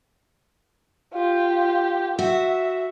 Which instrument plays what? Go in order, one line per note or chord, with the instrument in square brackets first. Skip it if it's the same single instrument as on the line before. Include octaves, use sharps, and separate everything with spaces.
[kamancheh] F4 G4
[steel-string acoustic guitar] F#4 [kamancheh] E5